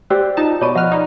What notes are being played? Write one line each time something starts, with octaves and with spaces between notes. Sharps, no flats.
G4 C5 D5 E6 F#6
D#4 F4 A5
B2 C#5 D5 B5 C#6 D#7
F3 D#5 F#5 F6 F#6
D#4 D5 B5